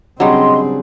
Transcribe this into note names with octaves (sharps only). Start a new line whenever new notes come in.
C#3 F#3 G3 C4 D4 G#4 D#5 C6